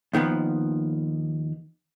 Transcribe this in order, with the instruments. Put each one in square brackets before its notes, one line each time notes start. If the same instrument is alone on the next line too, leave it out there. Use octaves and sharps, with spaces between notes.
[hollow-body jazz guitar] D#2 D#3 F3 B3